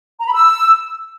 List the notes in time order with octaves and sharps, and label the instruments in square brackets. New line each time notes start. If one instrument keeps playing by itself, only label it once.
[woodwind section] A#5
B5
E6